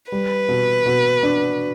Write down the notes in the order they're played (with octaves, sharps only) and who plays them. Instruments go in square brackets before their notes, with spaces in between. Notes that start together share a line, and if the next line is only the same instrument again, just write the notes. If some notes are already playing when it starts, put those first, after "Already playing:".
[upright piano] G3 [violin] B4
[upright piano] B2
B2
D4